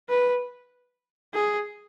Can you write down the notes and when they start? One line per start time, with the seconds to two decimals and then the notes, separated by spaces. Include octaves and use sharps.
0.09 B4
1.34 G#4